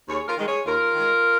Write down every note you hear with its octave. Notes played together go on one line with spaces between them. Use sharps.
D#2 G#4 C#5
F4 A#4
D#3 G#3
G#4 C#5
D#2 F4 A#4
D#3 G#3